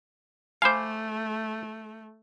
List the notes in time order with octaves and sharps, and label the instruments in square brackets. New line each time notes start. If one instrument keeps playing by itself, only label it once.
[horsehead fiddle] A3 [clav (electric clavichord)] C5 F5 [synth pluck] G#5 B5 D6